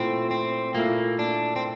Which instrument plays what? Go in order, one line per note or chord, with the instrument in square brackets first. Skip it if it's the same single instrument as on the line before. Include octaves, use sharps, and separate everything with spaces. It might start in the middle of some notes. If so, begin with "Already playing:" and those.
Already playing: [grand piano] A#2 A3 E4 [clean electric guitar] C4
[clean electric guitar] C4
[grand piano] A#2 A3 E4 [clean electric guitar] A#3
[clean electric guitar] D4
C4